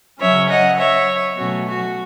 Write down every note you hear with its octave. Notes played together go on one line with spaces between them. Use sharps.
C#3 F#3 C#4 C#5 E5
D#5 F#5
C#5 E5
B2 F#3 A3 C#4 F#4
F#4